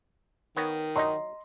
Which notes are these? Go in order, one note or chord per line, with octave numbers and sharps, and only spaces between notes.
D#3 B3 C#5 A#5
F#3 D#4 D#5 A#5 C6